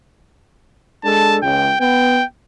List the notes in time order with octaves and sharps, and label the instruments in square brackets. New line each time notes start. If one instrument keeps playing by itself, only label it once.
[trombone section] G#3 D4 A4 [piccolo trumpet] A5
[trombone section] C#2 [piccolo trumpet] G5
[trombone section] B3 [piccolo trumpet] G5